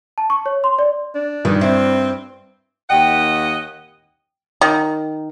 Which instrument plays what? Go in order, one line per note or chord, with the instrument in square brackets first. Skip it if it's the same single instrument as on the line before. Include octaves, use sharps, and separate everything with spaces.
[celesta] A5
C#6
C#5
C6
D5
[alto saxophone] D4
[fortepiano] G2 [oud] D#3
[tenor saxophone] C4 [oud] E4
[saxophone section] D#2 D#5 F#5 [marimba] G5
[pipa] D#3